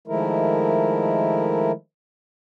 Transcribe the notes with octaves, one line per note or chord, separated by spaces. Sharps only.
D#3 F3 G#3 A3 E4 A#4